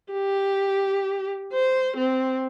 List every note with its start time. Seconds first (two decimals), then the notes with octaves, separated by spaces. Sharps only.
0.13 G4
1.53 C5
1.97 C4